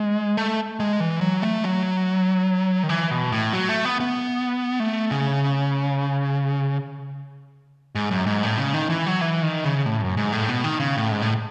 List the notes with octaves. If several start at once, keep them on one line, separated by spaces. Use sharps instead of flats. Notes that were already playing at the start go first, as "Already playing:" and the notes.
Already playing: G#3
A3
G#3
E3
F#3
A3
F#3
D#3
E3
B2
A2
F#3
A3
B3
B3
A3
C#3
G#2
F#2
G#2
A2
C#3
D#3
E3
F#3
E3
D#3
C#3
A2
F#2
G#2
A2
B2
D#3
C#3
A2
G#2
A2